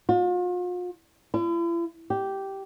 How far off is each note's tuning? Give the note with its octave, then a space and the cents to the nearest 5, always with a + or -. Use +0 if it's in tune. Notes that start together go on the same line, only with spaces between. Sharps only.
F4 +40
E4 +45
G4 -10